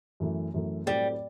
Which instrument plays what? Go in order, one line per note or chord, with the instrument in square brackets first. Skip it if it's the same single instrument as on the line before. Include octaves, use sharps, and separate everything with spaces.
[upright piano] F#2 E3 A3
F#2 E3 A3
[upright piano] A2 F#3 A3 C4 G4 [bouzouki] G3